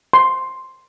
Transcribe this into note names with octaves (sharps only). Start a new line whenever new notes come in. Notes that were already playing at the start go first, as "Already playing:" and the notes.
C6